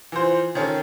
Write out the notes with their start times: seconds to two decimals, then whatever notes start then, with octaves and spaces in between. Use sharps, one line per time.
0.12 E3 F3 C5
0.55 D#3 C#4 A4